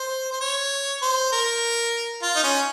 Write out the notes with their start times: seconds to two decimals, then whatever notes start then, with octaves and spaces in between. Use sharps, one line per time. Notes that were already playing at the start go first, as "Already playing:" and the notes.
Already playing: C5
0.33 C5
0.41 C#5
1.02 C5
1.32 A#4
2.23 F4
2.36 D#4
2.43 C#4